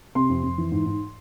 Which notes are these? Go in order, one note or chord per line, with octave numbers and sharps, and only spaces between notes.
C3 C6
F2
F2
E3
G#2
G#2